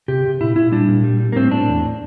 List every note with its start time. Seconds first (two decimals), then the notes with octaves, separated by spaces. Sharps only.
0.08 C3 G4
0.25 C3
0.41 A#2 E4
0.56 A#2 E4
0.72 G3 D4
0.88 A#2
1.04 G3
1.19 G3
1.32 A#3
1.35 A2 C4
1.51 A2 D4
1.69 E2